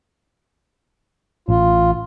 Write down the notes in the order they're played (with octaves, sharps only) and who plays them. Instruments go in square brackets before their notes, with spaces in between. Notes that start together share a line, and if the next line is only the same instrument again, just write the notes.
[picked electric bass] A1 [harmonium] F4